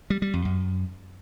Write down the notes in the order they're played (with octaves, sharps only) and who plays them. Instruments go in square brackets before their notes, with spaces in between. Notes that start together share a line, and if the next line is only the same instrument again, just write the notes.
[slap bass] G3
G3
F2
F#2